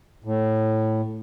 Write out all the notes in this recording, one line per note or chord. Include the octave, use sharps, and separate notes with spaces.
A2